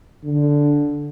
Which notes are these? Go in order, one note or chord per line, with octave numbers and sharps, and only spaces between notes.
D3